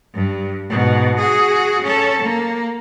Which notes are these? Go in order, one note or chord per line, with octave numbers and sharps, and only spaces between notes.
G2
G#2 B2
F#4 G#4
C#4 A4
A#3